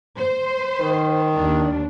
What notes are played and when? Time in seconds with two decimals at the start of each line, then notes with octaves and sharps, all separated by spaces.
0.18 C5
0.81 D#3
1.34 D#2 D4